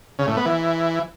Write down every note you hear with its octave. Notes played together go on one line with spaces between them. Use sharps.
C#3
A2
B3
E3